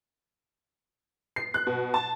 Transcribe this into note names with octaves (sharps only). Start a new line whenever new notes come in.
C7
F#6
B2
A5